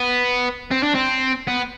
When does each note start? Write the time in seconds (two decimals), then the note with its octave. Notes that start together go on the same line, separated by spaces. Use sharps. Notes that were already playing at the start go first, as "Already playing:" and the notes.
Already playing: B3
0.71 C4
0.84 D4
0.95 C4
1.47 B3